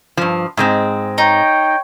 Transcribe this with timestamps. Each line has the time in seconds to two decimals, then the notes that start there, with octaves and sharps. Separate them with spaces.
0.17 G2 F3
0.57 G#2 G#3 C4
1.18 D#4 C#5 G5